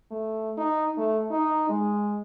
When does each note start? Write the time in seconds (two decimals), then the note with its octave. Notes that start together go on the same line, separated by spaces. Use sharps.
0.11 A3
0.58 D#4
0.97 A3
1.30 D#4
1.69 G#3